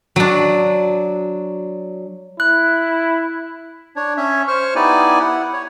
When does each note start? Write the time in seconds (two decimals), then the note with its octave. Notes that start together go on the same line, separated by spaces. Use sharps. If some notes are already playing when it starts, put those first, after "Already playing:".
0.16 F#3 D4
2.40 E4 F#6
3.96 D4 C#5
4.17 C#4 C#5 E5
4.48 C5 C#6 F6
4.76 B3 D#4 E4 G4 D5 G#5
5.20 E4 F#5
5.53 C#5